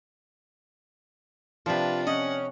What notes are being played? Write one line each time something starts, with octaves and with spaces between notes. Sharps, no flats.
C3 F3 D4 F4 B4
C#4 D#5 F#5